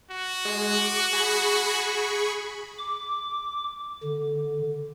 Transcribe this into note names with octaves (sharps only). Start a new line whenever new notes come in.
F#4
G#3
D6
G#4 B5 C#6
D6
D3